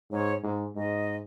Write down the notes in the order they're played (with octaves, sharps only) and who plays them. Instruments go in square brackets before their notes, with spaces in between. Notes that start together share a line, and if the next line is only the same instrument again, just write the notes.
[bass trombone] G#2 [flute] C#5
[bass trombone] G#2
[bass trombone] G#2 [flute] D#5